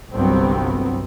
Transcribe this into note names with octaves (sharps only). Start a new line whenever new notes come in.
G1 C2 G2 F#3 B3 C4